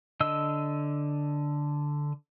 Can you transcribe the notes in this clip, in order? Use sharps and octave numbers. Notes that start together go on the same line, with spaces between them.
D3 D#5 E6